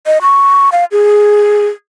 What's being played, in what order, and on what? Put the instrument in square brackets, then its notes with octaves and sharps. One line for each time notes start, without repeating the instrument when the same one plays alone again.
[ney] D#5
C#6
F5
G#4